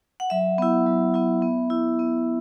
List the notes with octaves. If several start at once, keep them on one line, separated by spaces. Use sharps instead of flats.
F#5
F#3 E5
B3 E4
F#3
B3 E4
B3
E4
B3